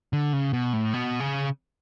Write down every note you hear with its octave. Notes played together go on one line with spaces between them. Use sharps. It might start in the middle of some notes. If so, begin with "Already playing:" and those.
D3
C#3
B2
A2
B2
C#3